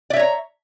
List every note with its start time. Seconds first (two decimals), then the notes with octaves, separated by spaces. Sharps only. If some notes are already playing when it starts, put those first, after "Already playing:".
0.10 D5
0.13 E5
0.16 C#5
0.19 A#5